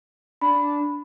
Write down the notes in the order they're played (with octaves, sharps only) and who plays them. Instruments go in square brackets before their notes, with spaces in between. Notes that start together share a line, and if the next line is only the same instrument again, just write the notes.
[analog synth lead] D4 [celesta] B5